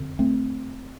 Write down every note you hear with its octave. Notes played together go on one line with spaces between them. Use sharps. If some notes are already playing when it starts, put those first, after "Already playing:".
Already playing: F2 D3
A3 C4